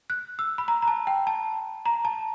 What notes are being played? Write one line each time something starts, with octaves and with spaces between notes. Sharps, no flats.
F#6
E6
B5
A#5
A#5
A5
G5
A5
A#5
A5